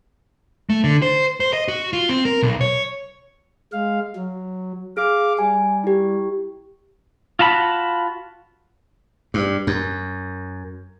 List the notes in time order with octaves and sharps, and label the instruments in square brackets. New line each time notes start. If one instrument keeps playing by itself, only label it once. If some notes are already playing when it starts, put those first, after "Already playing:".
[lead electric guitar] A3
D3
C5
C5
D#5
F#4
F4
C4
A#4
B1
C#5
[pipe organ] G#3 F5
F#3
[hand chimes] G#4 F6 [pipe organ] F5 D6
[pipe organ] G3 [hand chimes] G#5
[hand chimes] E4 G4
[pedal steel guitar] F4 F#4 A5 B5
[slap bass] G2
F#2